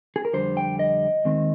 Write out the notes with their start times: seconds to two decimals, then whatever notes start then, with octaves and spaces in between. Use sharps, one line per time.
0.16 G#4
0.25 A#4
0.34 F2 D3 G3 C5
0.57 G5
0.79 D#5
1.25 D#2 D#3 G#3 C4